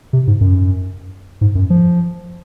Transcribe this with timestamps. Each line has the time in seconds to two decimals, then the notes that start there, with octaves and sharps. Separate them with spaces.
0.13 C3
0.27 G#2
0.41 F#2
1.41 G#2
1.55 F#2
1.70 F3